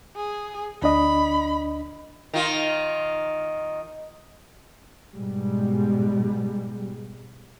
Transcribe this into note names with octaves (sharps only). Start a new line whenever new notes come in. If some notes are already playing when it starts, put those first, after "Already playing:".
G#4
D2 D4 D#5 B5
D#3 F4
G#2 B2 G3 G#3